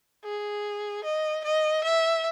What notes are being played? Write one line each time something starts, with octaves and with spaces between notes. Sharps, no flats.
G#4
D#5
D#5
E5